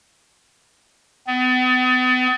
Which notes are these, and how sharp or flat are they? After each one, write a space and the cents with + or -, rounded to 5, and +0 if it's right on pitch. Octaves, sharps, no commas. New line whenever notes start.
B3 +40